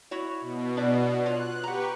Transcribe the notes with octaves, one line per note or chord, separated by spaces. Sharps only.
E4 F#4 C#5
B2
D4 E4 D5
F4 C#5 F#6
G4 B4 F#5 A#5 C#6